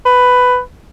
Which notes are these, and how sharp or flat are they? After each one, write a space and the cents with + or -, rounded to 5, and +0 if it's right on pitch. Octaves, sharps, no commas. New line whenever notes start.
B4 +10